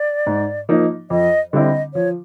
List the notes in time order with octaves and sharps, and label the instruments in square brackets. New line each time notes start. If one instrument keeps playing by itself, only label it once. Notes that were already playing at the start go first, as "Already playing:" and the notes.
Already playing: [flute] D5
[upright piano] G#2
F3 A#3 D#4
[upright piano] F2 [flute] D#5
[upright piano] D3 G3 C4 E4 [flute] D#5
[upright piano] F3 [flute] C#5